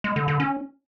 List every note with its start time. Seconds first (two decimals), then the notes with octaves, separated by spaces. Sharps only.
0.04 G#3
0.16 D3
0.28 D3
0.40 C#4